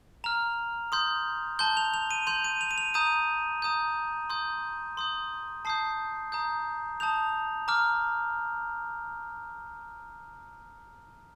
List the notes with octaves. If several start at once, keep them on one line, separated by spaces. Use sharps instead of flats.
A#5 F6 F7
C6 D#6 G6
A5 C6 G6 G7
F7
F7
D#7
C6 G6 F7
D#7
F7
D#7
F7
A#5 D#6 G6 D#7
A#5 D#6 G6
C6 D#6 G6
C6 D#6 G6
A5 D#6 G6 C7
A#5 D#6 G6
A5 D#6 G6 F7
A#5 D6 F6